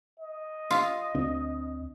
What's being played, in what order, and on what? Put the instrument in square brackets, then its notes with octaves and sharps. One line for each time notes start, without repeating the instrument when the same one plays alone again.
[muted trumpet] D#5
[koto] F4 F5
[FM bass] D2 [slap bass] C4 D4